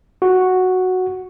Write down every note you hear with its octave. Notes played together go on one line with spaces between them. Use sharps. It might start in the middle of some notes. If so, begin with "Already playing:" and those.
F#4